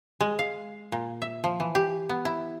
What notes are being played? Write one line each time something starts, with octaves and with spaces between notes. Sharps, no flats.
G#3
F5
A#2
E5
F3
E3
G4
B3
E4